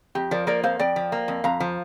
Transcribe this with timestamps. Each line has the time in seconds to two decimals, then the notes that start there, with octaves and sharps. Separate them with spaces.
0.15 F2 G4
0.31 F3 A#4 D5
0.47 A#3 A#4 D5
0.64 F2 C5 F5
0.79 F2 D5 G5
0.96 F3
1.12 A#3
1.28 F2
1.44 F2 F5 A#5
1.60 F3